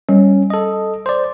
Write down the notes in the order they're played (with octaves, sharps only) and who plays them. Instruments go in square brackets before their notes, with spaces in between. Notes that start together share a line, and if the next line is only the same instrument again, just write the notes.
[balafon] G3 [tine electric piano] C#4
[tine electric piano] A4 D#5
C5 D5